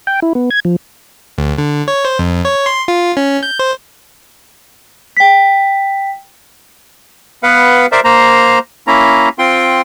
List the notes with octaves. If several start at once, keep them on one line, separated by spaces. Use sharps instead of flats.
G5
E4
B3
G#6
F3
D2
D3
C#5
C5
F2
C#5
C6
F4
C#4
G6
C5
G5 B6
B3 B4 F5 F#5
A#4 C5 D5 E5
A#3 C5 A#5
A#3 C#4 E4 A#5
C4 F4 G5 C6